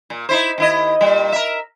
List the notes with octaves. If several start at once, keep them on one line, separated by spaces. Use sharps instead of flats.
A#2
D#4 E4 C5
D#2 E4 D#5
A#2 G3
A#4 E5